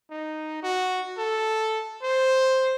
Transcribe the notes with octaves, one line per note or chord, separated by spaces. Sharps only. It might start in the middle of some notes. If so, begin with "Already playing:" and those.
D#4
F#4
A4
C5